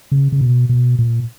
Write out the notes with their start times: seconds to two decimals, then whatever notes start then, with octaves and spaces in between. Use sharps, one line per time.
0.12 C#3
0.32 C#3
0.41 B2
0.69 B2
0.99 A#2